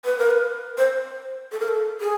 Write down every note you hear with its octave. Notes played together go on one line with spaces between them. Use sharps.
B4
A#4
B4
C5
A4
A#4
A4
G#4